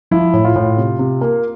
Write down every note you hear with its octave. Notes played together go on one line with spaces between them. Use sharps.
F3 E4
A2
F4
A2
C3
C3
A#3